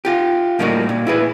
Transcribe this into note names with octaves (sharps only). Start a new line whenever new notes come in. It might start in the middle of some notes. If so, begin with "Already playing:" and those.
F4 G4
A2 G3 A#3 D#4 F4 F#4
A#2
E4 G#4 B4